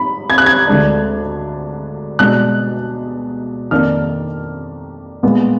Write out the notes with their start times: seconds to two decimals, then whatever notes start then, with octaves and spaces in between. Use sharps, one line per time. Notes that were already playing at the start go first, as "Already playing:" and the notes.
Already playing: G#2 B5
0.30 G#6
0.38 F#6
0.46 G#6
0.68 D2 D3 G#3 D4
2.19 B2 G#3 D4 F#6
3.71 F2 D#3 A#3 D4 F6
5.23 A#2 G#3 B3